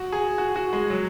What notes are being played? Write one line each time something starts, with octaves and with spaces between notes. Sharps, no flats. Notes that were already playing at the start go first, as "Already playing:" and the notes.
Already playing: F#4
G#4
F#4
F#4
G#3
F#3